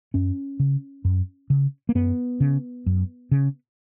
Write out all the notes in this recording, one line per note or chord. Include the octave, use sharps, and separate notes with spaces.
F#2 C#4
C#3
F#2
C#3
A#3
F#2 B3
C#3
F#2
C#3